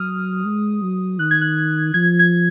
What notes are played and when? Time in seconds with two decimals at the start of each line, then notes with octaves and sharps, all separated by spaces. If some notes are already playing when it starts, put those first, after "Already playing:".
Already playing: F#3 D#6 F6
0.45 G#3
0.82 F#3
1.19 D#3 F#6
1.31 G#6
1.41 F#6
1.94 F3 G#6
2.19 G#6